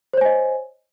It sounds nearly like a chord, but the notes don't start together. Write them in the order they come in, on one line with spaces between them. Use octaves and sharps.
C5 C#5 G#5 D#5